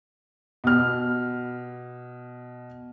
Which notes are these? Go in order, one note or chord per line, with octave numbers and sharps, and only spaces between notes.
B2 F6